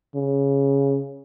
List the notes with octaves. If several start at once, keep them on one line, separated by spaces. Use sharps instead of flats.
C#3